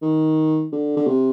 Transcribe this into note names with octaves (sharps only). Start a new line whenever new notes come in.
D#3
D3
D3
C3